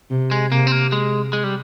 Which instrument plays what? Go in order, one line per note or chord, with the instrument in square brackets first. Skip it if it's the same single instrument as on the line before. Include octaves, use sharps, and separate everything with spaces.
[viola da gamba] C3
[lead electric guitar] G#3
[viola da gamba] C3 [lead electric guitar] A#3
[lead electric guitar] C4
A#3
G#3
G#3
G3